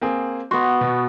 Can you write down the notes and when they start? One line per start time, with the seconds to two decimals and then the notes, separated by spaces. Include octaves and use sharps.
0.01 A#3 C4 G#4
0.51 B3 F#4 C6
0.81 B2